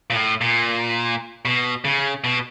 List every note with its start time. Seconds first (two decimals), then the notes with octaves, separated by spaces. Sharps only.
0.10 A#2
0.15 A2
0.41 A#2
1.45 B2
1.85 C#3
2.24 B2